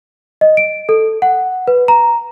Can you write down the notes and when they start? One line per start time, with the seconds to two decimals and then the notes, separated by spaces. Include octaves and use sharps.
0.41 D#5
0.57 D7
0.89 A4
1.22 F#5
1.67 B4
1.88 A#5